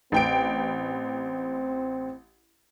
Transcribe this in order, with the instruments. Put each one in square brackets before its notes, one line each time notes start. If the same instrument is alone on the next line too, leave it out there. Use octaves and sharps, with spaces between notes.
[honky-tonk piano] A1 G5 D7 [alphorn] C4